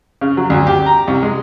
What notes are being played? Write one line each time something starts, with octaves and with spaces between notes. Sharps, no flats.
C#3
F#3
D2
G4
A#5
C2
G#3